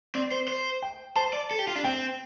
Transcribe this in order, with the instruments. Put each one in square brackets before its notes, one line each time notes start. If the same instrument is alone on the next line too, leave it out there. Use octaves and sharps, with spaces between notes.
[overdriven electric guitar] C4 [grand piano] D5
[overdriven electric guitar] C5
C5
[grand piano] G5
[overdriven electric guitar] C5 [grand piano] A5
[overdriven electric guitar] D5
A4
G4
F4
D4
[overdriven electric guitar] C4 [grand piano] G5